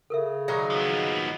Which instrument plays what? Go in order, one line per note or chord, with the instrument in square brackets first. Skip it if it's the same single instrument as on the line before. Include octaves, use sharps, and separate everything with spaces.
[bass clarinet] C#3 [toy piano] A4 A#4 E5
[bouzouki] D#3 F#3 D#4 [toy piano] G#4 A#5 B5
[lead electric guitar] F3 B3